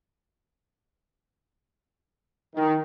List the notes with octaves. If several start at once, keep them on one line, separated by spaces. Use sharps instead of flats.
D#3